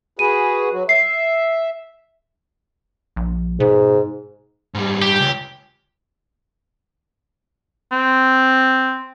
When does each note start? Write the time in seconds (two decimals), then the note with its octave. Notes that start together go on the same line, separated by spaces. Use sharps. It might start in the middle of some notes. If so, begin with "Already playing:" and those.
0.19 F#4 G#4 B4 D#7
0.72 F#3 F#4
0.89 E5 C7
3.16 A#1
3.60 G#2 B2
4.74 G#2 G3
5.02 G4
5.20 C#2
7.92 C4